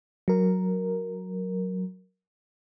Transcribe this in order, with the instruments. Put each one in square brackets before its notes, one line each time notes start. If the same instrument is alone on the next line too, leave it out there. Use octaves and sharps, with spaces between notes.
[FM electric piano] F#3 A#4